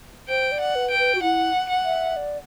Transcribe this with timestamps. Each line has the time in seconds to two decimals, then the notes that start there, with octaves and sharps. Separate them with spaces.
0.29 C5 G5
0.52 D5
0.60 F#5
0.75 B4
0.91 G5
0.99 B4
1.15 F#4
1.22 E4 F#5
1.69 F#5
1.85 E5
2.16 D5